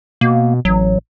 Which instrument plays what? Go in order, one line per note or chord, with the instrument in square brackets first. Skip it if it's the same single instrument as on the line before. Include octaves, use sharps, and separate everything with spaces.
[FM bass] B2 [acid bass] A#3
[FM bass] A1 [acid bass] F#3